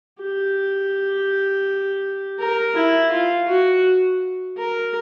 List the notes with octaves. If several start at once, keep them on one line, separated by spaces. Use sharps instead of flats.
G4
A#4
E4
F4
F#4
A#4